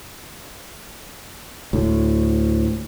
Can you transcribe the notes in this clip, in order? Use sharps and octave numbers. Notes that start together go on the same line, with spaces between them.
D2 A2